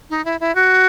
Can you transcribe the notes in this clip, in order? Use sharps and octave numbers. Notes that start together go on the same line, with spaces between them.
D#4
E4
E4
F#4